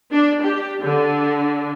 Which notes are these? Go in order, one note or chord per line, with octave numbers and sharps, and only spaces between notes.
D4
G4
D3